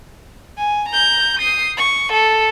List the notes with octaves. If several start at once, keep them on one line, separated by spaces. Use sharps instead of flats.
G#5
A#5 G6
D#6 C7
C#6
A4